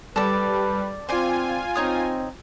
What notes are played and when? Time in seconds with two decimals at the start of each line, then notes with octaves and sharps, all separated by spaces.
0.16 G3 A4 B4 D5
1.09 C4 F4 C5 D5 G#5 C6
1.76 C4 D#4 C#5 D#6